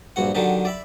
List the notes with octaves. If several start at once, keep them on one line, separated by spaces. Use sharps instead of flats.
A#1 G2 F#4 F#5
D3 D#3 F#3 D4 G4
D5 E5 B5